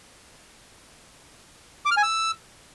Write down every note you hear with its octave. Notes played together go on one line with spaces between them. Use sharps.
D6
F6
G#5
E6